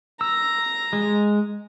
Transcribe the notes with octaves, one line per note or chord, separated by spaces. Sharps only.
A#5 E6
G#3